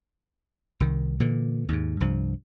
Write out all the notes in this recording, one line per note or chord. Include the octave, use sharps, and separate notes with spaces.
C2 D#3
A#2 D3 E3
D#2 G#2
C2 G2 F3